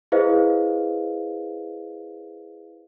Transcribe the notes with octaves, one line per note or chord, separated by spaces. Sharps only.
E4 G#4 B4 C5 D#5 F5